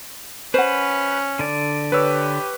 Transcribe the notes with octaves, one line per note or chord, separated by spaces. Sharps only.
C#4 B4 C5 F#5
D3 D5
G4 B4 C#5 E6